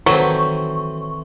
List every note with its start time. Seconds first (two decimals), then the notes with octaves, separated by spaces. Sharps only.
0.06 D#3 E3 F#3 C4 A4 C#6